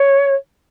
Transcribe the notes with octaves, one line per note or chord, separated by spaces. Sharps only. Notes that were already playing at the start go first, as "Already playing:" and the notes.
Already playing: C#5